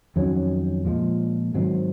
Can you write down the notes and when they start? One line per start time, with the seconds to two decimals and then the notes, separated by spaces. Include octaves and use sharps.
0.16 F2 D#3 F#3 C#4
0.85 A#2 F3 G#3
1.54 G#2 D#3 F#3 C4